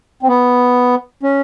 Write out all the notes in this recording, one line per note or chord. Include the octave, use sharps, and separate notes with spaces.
C4
B3
C#4